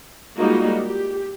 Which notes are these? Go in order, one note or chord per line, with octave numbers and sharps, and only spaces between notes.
G3 G#3 A#3 D#4 F4 F#4
G4